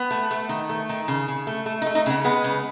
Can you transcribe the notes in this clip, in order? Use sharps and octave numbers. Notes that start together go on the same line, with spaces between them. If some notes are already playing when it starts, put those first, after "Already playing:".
Already playing: B3
A3
A3
D#3
A3
D#3
C#3
C#3
A3
A3
D#4
A3
D#4
C#3 B3
G#3 B3
C#3